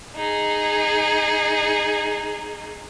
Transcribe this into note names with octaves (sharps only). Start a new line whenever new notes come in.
D#4 G#4